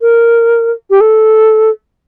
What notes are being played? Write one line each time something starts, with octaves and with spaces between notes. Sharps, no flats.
A#4
G4
A4